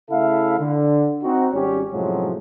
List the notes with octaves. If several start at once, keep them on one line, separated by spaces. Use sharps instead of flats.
C#3 A3 E4 A4 E5 F5
D3
C4 D#4 F#4
G#1 G3 C#4 G4 C#5
F#2 A2 C3 F3 F#3 G#3